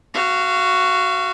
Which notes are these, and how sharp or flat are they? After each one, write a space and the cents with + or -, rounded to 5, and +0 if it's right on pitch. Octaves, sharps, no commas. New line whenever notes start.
F#4 +0 F5 -30